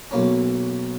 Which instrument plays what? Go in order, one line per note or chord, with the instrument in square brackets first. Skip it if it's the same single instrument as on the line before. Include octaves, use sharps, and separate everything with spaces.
[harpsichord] B1 A#3 C#4